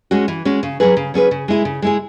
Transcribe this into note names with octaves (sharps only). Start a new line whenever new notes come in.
G#3 C#4 F#4
E3
G#3 C#4 F#4
C#3
F#3 C#4 G#4 B4
C#3
F#3 C#4 G#4 B4
C#3
G#3 E4 G#4
C#3
G#3 E4 G#4